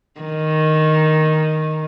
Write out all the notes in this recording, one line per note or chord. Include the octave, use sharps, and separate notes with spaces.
D#3